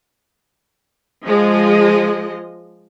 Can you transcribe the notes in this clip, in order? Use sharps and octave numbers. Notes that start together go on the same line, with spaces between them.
F3 G#3 D#5